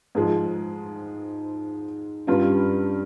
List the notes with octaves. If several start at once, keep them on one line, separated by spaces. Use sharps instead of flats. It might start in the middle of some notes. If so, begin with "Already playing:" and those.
G#2 F3 G#3
G2 G3 C#4 F4